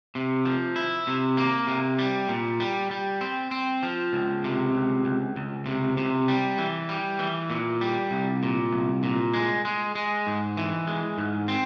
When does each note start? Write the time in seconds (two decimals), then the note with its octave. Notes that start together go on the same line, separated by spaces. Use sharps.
0.15 C3
0.45 F3
0.76 E4
1.07 C3
1.37 A#3
1.67 C3
1.99 G3
2.29 A#2
2.60 G3
2.91 G3
3.21 C4
3.51 C4
3.83 F3
4.13 C#2
4.44 C3
4.74 C#2
5.05 C#2
5.36 C#2
5.66 C3
5.97 C3
6.28 G3
6.58 E3
6.89 G3
7.19 E3
7.50 A#2
7.81 G3
8.11 C2
8.43 A#2
8.73 C2
9.03 A#2
9.34 G#3
9.65 G#3
9.95 G#3
10.27 G#2
10.57 E3
10.87 G#3
11.18 G#2
11.48 C4